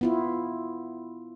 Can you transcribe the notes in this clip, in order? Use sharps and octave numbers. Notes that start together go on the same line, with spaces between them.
B3 E4 F4